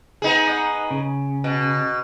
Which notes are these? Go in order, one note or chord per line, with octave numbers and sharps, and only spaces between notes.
B3 D#4 G#4
D#5 F#5
C#3
B2